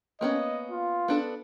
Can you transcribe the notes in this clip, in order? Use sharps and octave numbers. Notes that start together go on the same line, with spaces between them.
A#3 B3 C#4 D#5
F4
B3 D4 A4